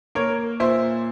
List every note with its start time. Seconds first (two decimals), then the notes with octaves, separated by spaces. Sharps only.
0.15 A#3 A#4 C#5
0.60 A#2 C5 E5